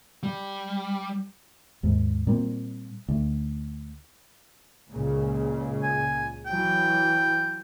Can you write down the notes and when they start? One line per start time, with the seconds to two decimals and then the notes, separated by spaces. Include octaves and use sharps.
0.23 G3
1.83 D#2 G#2
2.27 A#2 G3 A#3 C4
3.08 D2
4.90 C#2 A#2 C#3
5.83 G#5
6.46 E3 F#3 G5